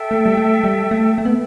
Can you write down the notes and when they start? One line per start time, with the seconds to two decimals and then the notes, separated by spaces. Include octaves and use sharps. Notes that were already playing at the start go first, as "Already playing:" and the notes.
Already playing: A4 E5 G5
0.11 A3
0.26 G3
0.37 A3
0.64 G3
0.91 A3
1.17 A3 A4 E5 G5
1.25 B3